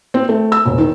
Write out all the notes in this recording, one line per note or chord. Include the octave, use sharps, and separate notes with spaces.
C4
A3
E6
E1
D#3